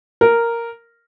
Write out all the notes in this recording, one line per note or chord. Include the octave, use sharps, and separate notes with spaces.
A#4